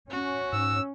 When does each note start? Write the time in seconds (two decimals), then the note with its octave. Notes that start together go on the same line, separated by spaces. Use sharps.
0.10 C#4 F#4
0.53 G#2 E6